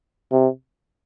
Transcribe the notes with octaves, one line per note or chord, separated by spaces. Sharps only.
C3